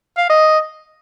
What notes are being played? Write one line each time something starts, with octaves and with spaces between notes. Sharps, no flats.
F5
D#5